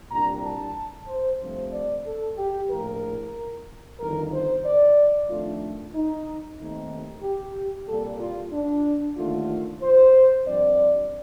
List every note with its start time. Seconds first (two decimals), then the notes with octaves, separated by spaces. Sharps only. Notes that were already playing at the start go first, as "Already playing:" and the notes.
0.11 C2 A#2 G3 D4 A#5
0.44 A5
1.08 C5
1.40 G2 F3 A3 C4 C5
1.72 D5
2.06 A4
2.37 G4
2.69 A#1 A2 F3 A#4
3.99 G1 F2 D#3 A#4
4.32 C5
4.65 D5
5.29 F2 D#3 A3 D4 F4
5.94 D#4
6.58 D#2 D#3 A3 C4 D#4
7.23 G4
7.87 C2 A#2 G3 A#3 A4
8.20 F4
8.52 D4
9.17 D#2 D3 A3 F4
9.81 C5
10.46 G2 F3 C4 D5